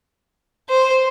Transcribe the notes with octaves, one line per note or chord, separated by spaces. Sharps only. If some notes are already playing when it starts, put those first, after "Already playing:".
C5